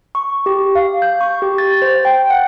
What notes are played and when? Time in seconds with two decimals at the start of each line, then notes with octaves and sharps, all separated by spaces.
0.15 C#6
0.46 G4
0.76 F5
1.02 G6
1.21 C#6
1.42 G4
1.58 A6
1.82 C5
2.05 G5
2.30 F#5